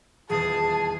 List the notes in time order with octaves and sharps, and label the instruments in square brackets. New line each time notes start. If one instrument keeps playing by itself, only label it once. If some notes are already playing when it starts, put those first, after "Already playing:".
[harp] D#1 E2 D#6 [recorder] G#4 [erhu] A5